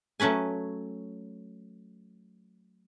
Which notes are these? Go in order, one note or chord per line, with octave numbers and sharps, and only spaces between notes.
F#3 A3 C#4 B4 G#5